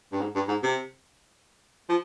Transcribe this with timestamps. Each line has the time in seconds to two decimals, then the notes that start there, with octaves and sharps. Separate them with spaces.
0.12 G2
0.20 G#2
0.35 G2
0.48 G#2
0.63 C3
1.89 F3